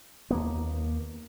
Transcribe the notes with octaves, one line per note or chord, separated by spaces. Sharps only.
D#2 A#3 B3